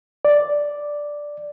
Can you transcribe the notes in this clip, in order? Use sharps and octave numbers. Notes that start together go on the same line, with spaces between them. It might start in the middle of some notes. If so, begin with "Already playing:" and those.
D5